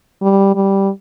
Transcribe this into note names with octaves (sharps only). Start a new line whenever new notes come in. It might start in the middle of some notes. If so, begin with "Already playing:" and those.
G3
G3